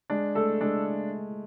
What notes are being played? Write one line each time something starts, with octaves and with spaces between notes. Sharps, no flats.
G#3 D4
A3 A4
G#3 D4